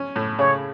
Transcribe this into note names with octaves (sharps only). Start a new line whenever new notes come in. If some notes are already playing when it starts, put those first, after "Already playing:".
Already playing: C#4
A2
C#3 C#5